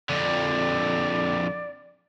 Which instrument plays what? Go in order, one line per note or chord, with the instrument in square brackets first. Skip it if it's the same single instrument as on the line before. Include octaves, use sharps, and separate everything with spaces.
[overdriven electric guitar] F2 D3 [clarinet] D5